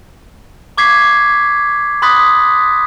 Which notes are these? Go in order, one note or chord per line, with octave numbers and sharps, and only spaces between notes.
C#6 D6 G#6 B6 C7
B5 C6 D#6 F#6 A6 B6